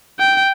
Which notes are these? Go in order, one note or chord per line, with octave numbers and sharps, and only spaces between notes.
G5